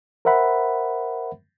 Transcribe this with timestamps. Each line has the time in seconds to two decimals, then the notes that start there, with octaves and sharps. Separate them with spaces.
0.25 A#4 C5 E5 F#5 B5